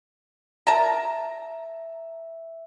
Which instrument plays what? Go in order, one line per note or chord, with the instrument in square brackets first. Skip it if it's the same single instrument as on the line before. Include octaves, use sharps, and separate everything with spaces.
[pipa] A#4 A5 A#5 [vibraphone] E5